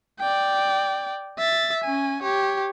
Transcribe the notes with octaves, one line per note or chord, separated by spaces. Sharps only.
D5 G5
E5 A6
C#4 G#5
G4 C#5